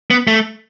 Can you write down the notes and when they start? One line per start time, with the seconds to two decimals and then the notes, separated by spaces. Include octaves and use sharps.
0.11 B3
0.27 A3